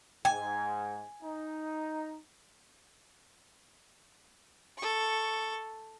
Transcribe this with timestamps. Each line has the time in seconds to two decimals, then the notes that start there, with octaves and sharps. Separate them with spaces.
0.25 G#2 G5 G#5
1.22 D#4
4.78 A4 C#6